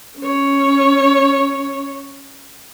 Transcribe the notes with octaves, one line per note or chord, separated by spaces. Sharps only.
C#4 C#5